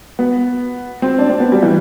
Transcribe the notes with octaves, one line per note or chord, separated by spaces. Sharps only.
B3
C4
D4
C4
B3
G3
E3